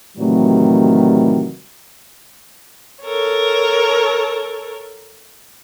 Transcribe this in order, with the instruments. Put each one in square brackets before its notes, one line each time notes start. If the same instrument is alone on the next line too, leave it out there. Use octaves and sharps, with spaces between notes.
[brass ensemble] A2 C3 D#3 E3 F#3 G3
[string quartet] A4 A#4 C#5